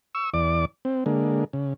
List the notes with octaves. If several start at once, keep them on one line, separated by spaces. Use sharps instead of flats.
C#6 E6
E2 D5 D6
C4
D3 G#3 A#3
C#3